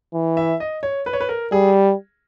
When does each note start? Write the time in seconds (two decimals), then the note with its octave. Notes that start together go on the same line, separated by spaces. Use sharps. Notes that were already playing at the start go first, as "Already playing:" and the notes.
0.14 E3
0.37 E5
0.60 D#5
0.83 C#5
1.06 B4
1.13 C#5
1.21 B4
1.29 A#4
1.52 G3 G#4